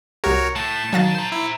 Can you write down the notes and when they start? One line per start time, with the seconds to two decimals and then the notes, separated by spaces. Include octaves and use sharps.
0.24 C2 F#4 G4 A#4 C#5
0.56 A2 A3 A5
0.93 D#3 F#3 F5 A6
1.15 C5 A#5
1.32 E4